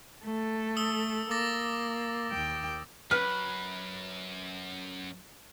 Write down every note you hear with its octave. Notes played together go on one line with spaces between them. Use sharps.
A3 A4
D#6 E6 G7
A#3 D6 A6 A#6
D#2 G5
F#2 B4 F6